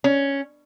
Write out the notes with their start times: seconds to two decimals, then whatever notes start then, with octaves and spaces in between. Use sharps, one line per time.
0.04 C#4